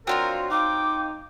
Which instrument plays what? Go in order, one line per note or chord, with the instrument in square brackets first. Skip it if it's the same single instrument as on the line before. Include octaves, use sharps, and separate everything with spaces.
[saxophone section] F#3 D4 F#4 [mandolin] C4 F4 F5 [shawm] A#4
[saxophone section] D#4 [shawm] G5 [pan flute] D6